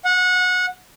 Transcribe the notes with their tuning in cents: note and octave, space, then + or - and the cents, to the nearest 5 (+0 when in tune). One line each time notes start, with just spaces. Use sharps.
F#5 -25